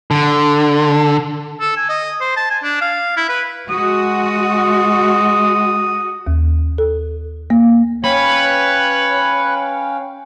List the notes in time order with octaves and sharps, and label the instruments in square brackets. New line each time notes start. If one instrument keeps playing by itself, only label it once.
[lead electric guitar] D3
[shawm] A4
G#5
D#5
C5
A5
G#5
D4
F5
E4
B4
[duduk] G#3 [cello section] F#4 [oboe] D#6
[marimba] D#2
A4
A#3
[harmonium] C#4 F5 G5 [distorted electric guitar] B4 [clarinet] C#5